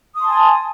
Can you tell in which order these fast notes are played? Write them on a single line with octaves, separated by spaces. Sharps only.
D#6 C6 A5 G#5